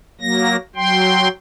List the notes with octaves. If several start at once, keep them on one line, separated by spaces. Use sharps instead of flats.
F#3 A#3 A#6
F#3 G5 C6